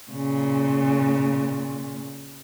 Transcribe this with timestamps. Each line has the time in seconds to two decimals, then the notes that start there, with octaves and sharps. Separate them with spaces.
0.11 A#2 C#3